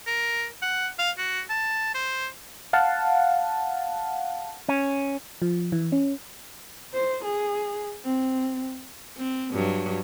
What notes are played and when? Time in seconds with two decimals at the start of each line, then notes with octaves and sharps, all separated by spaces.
0.07 A#4
0.62 F#5
0.99 F5
1.18 F#4
1.50 A5
1.95 C5
2.73 F5 F#5 A5
4.69 C#4
5.42 F3
5.72 E3
5.92 C#4
6.94 C5
7.24 G#4
8.05 C4
9.17 C4
9.53 G2 F#3